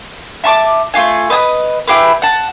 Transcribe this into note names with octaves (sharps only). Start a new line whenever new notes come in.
E5 A5 C#6 D6
A3 D#4 F4 G#5
B4 D#5 G#5 D#6
E4 G4 G#4 B4
F#5 A5